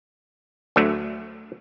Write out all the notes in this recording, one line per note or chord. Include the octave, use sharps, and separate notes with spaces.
D2 D3 F#3 A3